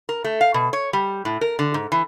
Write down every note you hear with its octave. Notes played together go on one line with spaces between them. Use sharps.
A#4
A3
F5
B2
C#5
G3
A2
A#4
D3
G#2
E3